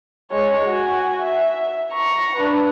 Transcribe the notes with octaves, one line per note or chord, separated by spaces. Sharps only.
G#3 C#5
F#4 G#5
E5
A#5 C#6
D4 B4